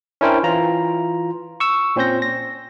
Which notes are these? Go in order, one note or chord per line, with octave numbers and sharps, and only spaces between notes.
C#4 D4 E4 A#4 C5 G5
E3 F4 A#5
C#6 E6
A#2 C4 C#4 C5 G6 A#6
A#6